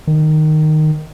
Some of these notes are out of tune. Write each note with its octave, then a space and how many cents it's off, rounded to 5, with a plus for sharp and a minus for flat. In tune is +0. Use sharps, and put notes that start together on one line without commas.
D#3 -10